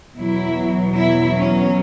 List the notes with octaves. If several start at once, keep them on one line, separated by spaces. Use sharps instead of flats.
E2 B2 F#3 E4
E4
C#4